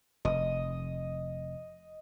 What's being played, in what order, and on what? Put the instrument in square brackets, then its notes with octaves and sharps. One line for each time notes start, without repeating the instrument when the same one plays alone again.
[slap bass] F1 [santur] D#5